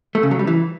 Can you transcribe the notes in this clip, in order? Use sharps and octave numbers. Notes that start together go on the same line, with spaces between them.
A3
C#3
F#3
G3
E3